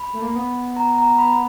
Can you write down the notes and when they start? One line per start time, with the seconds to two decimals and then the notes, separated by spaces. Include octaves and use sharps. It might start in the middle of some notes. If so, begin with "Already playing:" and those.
Already playing: B5
0.14 A3
0.22 A#3
0.36 B3
0.76 A#5
0.98 A#5
1.18 B5